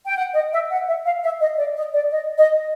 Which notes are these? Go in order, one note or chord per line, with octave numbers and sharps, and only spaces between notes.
G5
F#5
D#5
E5
F#5
E5
F5
E5
D#5
D5
D#5
D5
D#5
D#5